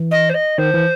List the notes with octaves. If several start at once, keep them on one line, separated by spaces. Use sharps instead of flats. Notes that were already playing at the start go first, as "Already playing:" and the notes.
Already playing: E3
D#5
C5
D#5
D#3 C5
E3